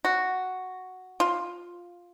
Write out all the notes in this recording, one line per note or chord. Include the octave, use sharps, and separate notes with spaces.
F#4
F4